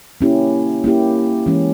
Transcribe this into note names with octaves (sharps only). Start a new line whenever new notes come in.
A#3 C#4 E4 G4
A#3 C#4 E4 G4
E3 G#3 C#4